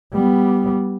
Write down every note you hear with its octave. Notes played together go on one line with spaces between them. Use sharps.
G3 B3